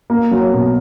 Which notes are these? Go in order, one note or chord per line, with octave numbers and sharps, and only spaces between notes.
A#3
F#3
B2